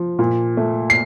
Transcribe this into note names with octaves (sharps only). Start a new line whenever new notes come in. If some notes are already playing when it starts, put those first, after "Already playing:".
Already playing: F3
A#2
A3
C7